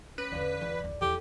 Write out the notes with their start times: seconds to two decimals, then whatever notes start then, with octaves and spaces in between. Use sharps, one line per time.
0.18 C#4 B4
0.32 E2 D3 D5 F5 B5
0.61 E2 D5
0.84 D1 A1
1.02 E2 G4 A4